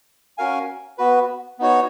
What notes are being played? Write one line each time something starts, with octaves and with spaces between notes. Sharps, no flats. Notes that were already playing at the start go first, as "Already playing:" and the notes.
C#4 F#4 A#4 F5 G#5
B3 F#4 B4
B3 D#4 F#4 C#5